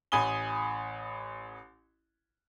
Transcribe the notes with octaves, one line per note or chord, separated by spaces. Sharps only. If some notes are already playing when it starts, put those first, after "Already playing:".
A1 G#5 B5 D#6 G7